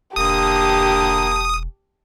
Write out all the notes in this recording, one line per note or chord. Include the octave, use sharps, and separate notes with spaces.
E1 D3 A#3 G4 A5 D#6